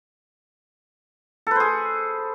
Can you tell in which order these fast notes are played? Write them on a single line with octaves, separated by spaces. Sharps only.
A4 B4 C5 G#4